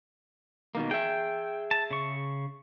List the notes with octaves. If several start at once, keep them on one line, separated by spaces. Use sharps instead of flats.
B2 D#3 A#3
G#4 E5 G5
A5
C#3 C#6